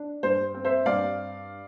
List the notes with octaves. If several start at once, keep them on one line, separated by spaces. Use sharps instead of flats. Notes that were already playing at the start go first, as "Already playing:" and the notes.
Already playing: D4
G2 C5
C4
C5 E5
G2 D5 F5